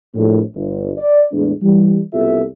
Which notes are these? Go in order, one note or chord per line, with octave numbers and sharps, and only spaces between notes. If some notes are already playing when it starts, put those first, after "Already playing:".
A#1 A2
G1
D5
E2 A2 G#3 D4
E3 G3
F#1 C2 B3 F4 A4 E5